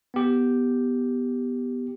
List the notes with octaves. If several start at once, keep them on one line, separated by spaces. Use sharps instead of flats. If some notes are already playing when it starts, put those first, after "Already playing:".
B3 G4